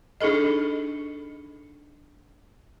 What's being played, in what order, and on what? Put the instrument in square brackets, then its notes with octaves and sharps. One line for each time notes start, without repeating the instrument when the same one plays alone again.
[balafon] D4 D#4 G#4 A4 D#5